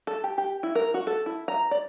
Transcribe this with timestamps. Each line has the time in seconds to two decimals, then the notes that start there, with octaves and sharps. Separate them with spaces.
0.07 A4
0.24 G4
0.38 G4
0.63 E4
0.75 A#4
0.94 F#4
1.07 A4
1.26 E4
1.48 A#5
1.71 D5